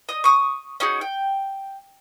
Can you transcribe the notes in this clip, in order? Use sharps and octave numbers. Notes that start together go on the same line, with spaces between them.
D#5 D#6
C#6 D#6
C#4 D#4 F#4 G#4
G5